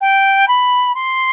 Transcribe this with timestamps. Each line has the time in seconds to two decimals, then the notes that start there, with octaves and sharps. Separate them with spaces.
0.01 G5
0.48 B5
0.95 C6